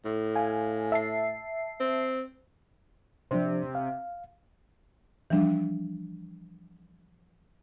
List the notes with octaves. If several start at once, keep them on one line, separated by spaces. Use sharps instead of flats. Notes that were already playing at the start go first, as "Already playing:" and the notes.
A2
F5 G#5
E5 A5 C7
C4
C3 F3 D4 C5
F5
E3 F3 G3 D4